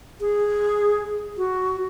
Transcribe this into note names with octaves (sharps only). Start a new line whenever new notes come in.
G#4
F#4